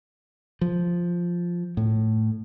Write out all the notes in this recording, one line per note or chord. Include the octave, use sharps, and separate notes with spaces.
F3
A2